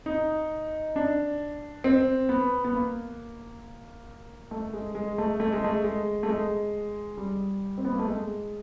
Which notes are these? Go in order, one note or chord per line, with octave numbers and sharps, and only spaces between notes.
D#4
D4
C4
B3
B3
A#3
A3
G#3
G#3
A3
A3
G#3
A3
G#3
A3
G#3
G3
C4
B3
A#3
A3
G#3